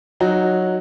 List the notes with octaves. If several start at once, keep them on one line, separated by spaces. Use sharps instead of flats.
F#3 D#4 F#4